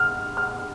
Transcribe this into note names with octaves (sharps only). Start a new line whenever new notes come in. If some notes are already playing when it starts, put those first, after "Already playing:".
Already playing: F6
F6